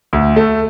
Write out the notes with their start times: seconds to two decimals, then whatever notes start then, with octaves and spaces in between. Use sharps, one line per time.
0.13 D2
0.36 A3